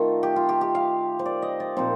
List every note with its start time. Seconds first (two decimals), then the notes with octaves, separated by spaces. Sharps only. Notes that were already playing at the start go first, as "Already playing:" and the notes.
Already playing: D#3 A3 D#4 F4
0.23 G4
0.36 F4
0.49 G4
0.61 G4
0.75 F5
1.19 C5
1.26 D5
1.42 D#5
1.60 D5
1.77 A#2 F3 C4 D#4 C5